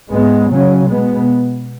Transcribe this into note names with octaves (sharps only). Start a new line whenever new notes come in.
G#2 G#3 B3
C#3 F#3 C#4
B2 G#3 B3